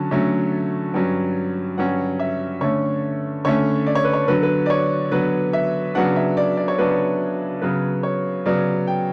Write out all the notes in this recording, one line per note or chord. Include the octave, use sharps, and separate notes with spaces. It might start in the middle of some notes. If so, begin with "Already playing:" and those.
Already playing: D3 F#3 C#4 A5
D3 F#3 A3 C#4
G2 F#3 C#4
G2 F#3 C#4 F#5
E5
D3 A3 C#4 C#5
D3 A3 C#4 C#5
D5
C#5
B4
C#5
D3 F#3 B3 B4
B4
D5
C#5
D3 F#3 B3 B4
E5
C#3 F#3 B3 D4 F#5
E5
D5
D5
C#5
C#3 F#3 B3 D4 B4
C#5
C#3 F#3 B3 B4
C#5
C#3 F#3 B3 D5
G5